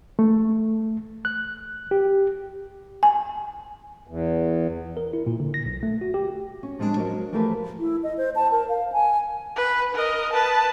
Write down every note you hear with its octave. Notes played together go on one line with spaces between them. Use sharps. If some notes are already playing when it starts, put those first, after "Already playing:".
A3
F#6
G4
G#5
E2
A#4
E4
A#2
D3
A#6
B1
A3
F#4
G4
C#4
F3 G3 G#3 A#3 D4
F3 F#3 F#4 A#4 D#5
E3 F3 A3 G4 A#4 B4
E4
D#5
C5
A5
A#4
F5
G#5
B4
A#4 D#5
B4 A5